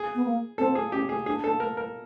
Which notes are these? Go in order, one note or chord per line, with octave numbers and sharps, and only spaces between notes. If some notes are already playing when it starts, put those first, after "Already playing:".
Already playing: G#4
B3
A#3
C4 A4
G#4
C#4 G4
G#4
D4 G#4
A4
A#4
A#4